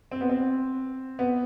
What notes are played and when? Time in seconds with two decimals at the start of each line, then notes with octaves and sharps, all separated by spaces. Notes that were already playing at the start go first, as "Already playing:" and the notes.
0.11 C4
0.21 B3
0.29 C4
1.19 B3